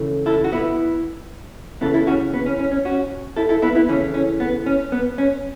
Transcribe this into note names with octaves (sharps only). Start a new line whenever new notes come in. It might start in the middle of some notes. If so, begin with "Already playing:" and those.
Already playing: C#3 E3 A3
E4 A4
F#4
B3 E4
C#3 E3 B3 E4 A4
E4 A4
C#4 F#4
B3
C#4
C#4
C#4
C#4 F#4
E4 A4
E4 A4
B3 E4
B3 E4
C#3 E3 A3 C#4
C#4
B3
C#4
B3
C#4